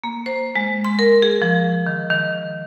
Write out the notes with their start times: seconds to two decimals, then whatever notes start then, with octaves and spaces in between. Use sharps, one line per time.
0.04 A#3
0.26 C5
0.56 G#3
0.84 C6
0.99 A#4
1.22 G#4
1.42 F3
1.86 D#3
2.10 D#3